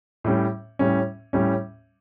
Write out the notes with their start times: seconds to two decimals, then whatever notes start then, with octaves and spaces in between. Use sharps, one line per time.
0.24 A2 G3 C#4
0.79 A2 G3 C#4
1.33 A2 G3 C#4